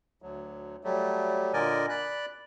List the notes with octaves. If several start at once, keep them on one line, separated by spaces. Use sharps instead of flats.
D2 F#3
F#3 G3 A3
A#2 D3 A#4 D5 D#5 G#5
D5 B5 F#6